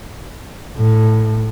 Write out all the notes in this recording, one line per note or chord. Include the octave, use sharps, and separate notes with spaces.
A2